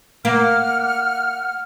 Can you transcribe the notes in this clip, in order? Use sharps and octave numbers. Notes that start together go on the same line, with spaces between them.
A#3 F#5 F6